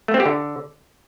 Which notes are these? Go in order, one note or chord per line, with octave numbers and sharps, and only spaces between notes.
A3
C4
G4
D3